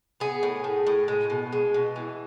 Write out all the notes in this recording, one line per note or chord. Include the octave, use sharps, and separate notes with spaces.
B3 G#4
A2
A2
A2
G#3
B2
G#3
B2
E3